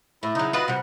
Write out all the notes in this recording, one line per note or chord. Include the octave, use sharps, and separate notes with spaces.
A2 E4
C#3 F#3 D#4
F4 F#4 B4 D#5
C3 G3 F#5